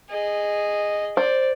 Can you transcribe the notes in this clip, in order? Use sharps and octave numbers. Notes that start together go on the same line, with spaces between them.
G#4 D#5
C5 D5